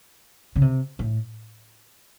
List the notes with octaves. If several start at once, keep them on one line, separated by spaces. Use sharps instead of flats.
C#3
C3
A2